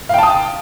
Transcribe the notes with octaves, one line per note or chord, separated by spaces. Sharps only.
F5 G5 A5 D#6